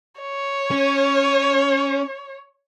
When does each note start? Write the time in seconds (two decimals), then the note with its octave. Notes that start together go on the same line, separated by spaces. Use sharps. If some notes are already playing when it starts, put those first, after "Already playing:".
0.21 C#5
0.71 C#4